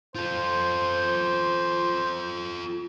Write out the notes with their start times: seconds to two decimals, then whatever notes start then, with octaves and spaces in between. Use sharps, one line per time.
0.15 F4 A4 C5